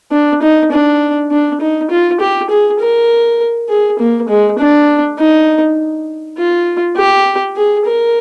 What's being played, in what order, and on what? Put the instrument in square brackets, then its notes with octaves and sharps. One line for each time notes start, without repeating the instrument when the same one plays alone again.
[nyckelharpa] D4
D#4
D4
D4
D#4
F4
G4
G#4
A#4
G#4
A#3
G#3
D4
D#4
F4
G4
G#4
A#4